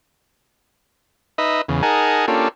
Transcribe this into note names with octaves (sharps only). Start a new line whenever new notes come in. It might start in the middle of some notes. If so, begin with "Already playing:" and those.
D#4 B4 D#5 E5
E2 C#3
D#4 G#4 A#4 F#5 G#5 A5
A#3 C#4 D4 F4 G4 A4